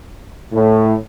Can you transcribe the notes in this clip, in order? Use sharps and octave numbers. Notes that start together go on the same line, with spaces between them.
A2